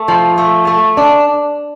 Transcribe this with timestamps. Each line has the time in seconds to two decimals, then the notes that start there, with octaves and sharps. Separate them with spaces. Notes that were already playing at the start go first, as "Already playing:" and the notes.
Already playing: A3
0.08 F3
0.38 A3
0.67 A3
0.97 D4